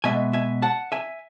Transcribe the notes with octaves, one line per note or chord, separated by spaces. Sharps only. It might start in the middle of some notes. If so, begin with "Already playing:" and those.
B2 G#3 B3 E5 G#5
E5 G#5
F#5 A5
E5 G#5